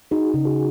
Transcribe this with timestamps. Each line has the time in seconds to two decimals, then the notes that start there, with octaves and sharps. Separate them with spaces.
0.11 D#4 F#4 G#4
0.34 C#3
0.45 F#4 G#4